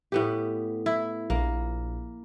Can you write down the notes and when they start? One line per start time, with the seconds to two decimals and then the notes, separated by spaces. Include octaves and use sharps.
0.12 A2 B3 G4
0.86 E4
1.30 A#1 A#3